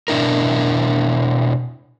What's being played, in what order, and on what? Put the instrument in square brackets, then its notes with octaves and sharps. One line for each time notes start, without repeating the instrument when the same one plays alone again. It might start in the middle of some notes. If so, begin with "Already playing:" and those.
[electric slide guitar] B2 D4 E4 A#4